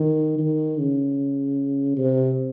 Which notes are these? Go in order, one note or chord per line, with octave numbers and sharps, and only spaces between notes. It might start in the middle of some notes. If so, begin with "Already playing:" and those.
Already playing: D#3
D#3
C#3
C3